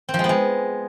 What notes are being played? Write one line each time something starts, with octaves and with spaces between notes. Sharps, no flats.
C4
F3
G#3
B3
G#3